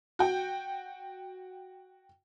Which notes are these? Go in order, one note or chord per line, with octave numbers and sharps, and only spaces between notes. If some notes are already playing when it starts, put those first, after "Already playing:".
F#4 G5